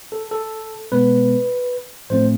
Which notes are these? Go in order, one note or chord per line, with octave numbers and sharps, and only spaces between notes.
A4
A4
B2 G#3 B3 B4
A2 F3 A3 C4 C5